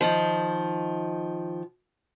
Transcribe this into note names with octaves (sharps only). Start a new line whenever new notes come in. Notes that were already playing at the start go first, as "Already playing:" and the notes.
D#3 F3